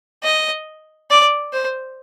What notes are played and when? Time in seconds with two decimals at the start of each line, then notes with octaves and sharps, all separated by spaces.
0.23 D#5
1.10 D5
1.53 C5